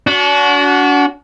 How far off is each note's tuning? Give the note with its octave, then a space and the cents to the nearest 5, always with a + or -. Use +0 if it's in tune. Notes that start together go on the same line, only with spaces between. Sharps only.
D4 -40 F#4 +0